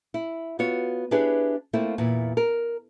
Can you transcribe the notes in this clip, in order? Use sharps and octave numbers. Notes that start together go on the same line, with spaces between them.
E4
B3 F4 F#4 C#5
D4 E4 G4 G#4 B4 C#5
A3 A#3 C4 E4 F4
E2 A#2 E4
A#4